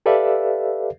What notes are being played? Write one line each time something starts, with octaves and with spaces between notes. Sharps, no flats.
G4 A4 B4 D5 E5 F5